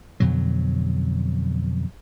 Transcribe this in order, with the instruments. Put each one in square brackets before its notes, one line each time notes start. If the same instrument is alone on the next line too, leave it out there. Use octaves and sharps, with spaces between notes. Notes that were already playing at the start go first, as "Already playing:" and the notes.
[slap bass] F2 B2 D3 F#3